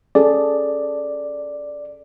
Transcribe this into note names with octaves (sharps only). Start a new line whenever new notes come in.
C#4 G#4 A4 D5